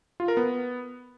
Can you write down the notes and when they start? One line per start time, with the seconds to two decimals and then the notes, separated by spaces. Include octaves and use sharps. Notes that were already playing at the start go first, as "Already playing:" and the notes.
0.20 F4
0.28 A#4
0.37 B3